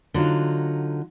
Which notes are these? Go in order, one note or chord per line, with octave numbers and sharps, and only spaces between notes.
D3 F#3 D#4 F4